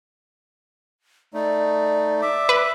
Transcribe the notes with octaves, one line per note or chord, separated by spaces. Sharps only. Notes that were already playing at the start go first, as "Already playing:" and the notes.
A3 D#4 D5
E5 D6
B4